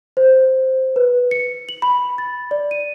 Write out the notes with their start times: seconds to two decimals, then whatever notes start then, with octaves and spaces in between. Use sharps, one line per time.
0.17 C5
0.96 B4
1.31 C#7
1.69 F#7
1.82 B5
2.18 A6
2.51 D5
2.71 D#7